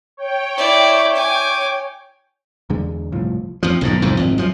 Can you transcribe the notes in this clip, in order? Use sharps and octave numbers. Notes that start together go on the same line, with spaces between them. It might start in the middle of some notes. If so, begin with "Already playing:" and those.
C#5 G5
E4 D5
G#5 D6
E2 D3 G#3
G1 C2 A2 F3
F2 F3
B1 G#2 D#3
C2 F2 G#2
G#1 F2
F#2 F3